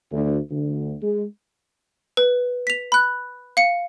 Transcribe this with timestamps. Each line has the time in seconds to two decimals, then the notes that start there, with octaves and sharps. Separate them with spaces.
0.12 D2
0.50 D2
1.02 G#3
2.17 B4
2.67 B6 F7
2.92 B5 F#6
3.57 F5 C#7